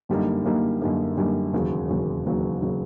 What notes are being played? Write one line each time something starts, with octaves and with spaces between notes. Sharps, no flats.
F#2 D3 G3 A#3 D#4
F#2 D3 G3 A#3 D#4
F#2 D3 G3 A#3 D#4
F#2 D3 G3 A#3 D#4
E1 D#2 C#3 F#3
E1 D#2 C#3 F#3
E1 D#2 C#3 F#3
C#3 F#3